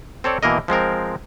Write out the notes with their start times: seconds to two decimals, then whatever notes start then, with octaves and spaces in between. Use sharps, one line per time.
0.24 C4 A4 C#5 D5
0.43 B2 E3 A#3 A#4 D#5
0.68 F3 G#3 C4 A#4